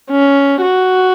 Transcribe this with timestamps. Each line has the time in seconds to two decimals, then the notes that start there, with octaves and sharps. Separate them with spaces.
0.11 C#4
0.62 F#4